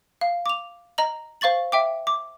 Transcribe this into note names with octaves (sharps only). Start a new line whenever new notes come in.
F5
D6 F7
D#5 A#5 F#7
C5 F5 C#6 A6 F#7
E5 G5 D6
D6